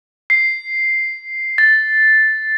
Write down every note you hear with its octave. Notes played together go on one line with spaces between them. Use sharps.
C7
A6